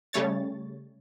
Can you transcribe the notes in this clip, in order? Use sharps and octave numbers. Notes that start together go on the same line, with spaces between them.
C#3 G3 A3 C#5 A6